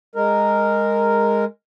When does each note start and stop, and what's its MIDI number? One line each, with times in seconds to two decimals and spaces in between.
0.15 1.45 56
0.15 1.45 70